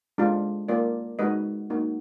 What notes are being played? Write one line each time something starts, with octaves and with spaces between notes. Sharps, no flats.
G#3 D4 F4
A#3 F4 A#4 D5
G#3 D#4 F#4 B4 D#5
A#3 D#4 F#4